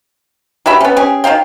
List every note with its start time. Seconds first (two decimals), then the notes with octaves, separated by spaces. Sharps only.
0.66 F#3 G4 E5 B5
0.81 B3 C#4
0.96 C#4 G4 G#4
1.24 D#3 F#3 F5 G5